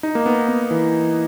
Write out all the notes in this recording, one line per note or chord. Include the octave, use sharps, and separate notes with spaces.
D#4
A#3
B3
B3
E3